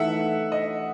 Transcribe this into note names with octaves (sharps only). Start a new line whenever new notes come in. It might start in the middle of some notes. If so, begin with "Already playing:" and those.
Already playing: E3 A3 D#4 A4 E5 F#5
D#5